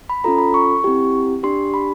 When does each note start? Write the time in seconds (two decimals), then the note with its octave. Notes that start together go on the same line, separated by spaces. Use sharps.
0.10 B5
0.24 C#4 F4 A4 A#5
0.38 B5
0.54 C#6
0.84 C4 E4 G4
1.43 D4 G4 C6
1.74 B5